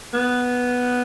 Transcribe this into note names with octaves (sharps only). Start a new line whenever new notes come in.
B3